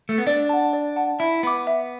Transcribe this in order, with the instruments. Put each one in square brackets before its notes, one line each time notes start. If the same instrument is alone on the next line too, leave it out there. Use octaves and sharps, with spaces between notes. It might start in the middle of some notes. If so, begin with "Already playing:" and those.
[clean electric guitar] A3
B3
[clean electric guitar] D4 [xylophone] D5
[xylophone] F#5 A5
D5
F#5 A5
[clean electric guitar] E4 [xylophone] E5
[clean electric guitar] B3 [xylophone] B5 D6
[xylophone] E5